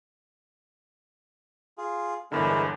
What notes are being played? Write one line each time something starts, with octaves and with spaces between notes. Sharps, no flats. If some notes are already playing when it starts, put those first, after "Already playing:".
F4 G#4
G1 E2 D3 G#3 E4 A#4